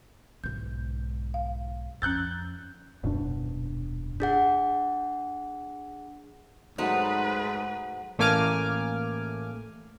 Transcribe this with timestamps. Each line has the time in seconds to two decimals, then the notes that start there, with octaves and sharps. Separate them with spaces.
0.44 B1 G#2 G6
1.34 F5
2.02 F2 C#4 E6 F#6 G6 A6
3.03 D#1 F#2 B2 D4
4.20 D4 G#4 F#5
6.78 G#2 F#3 A3 D#4 B4 C5 F#5
8.18 A1 A3 A#3 G#5 D6 F6